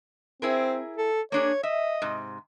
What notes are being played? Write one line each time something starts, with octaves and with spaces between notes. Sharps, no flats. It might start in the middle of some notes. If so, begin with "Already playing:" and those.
C4 E4 G#4 A#4
A4
A#3 D4 G#4 C#5
D#5 E5
G#2 C3